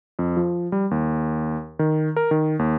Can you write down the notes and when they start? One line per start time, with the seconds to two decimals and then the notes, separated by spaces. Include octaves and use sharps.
0.19 F2
0.37 F3
0.72 G3
0.91 D#2
1.79 D#3
2.16 A#4
2.31 D#3
2.59 D#2